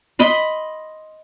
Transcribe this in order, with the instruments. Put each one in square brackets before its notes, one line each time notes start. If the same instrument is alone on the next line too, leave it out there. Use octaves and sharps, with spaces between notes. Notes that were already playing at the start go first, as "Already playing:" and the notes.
[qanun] D#5 B5 C6